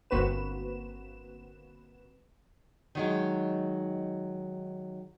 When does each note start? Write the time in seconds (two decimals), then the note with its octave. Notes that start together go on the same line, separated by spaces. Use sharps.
0.10 G1 A#3 C4 F#4 B4 E7
2.95 D#3 F#3 G#3